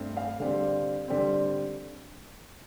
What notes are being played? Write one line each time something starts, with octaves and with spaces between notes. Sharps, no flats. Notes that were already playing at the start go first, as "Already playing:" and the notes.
Already playing: G2 A3 C4
F5
D3 G3 C4
D3 G3 C4